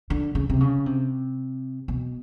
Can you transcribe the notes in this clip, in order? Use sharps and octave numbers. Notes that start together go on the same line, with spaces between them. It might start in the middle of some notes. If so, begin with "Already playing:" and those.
D3
C#3
C3
C#3
C3
B2